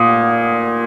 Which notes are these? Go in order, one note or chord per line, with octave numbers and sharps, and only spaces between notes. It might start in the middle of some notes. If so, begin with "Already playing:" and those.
Already playing: A#2 D#6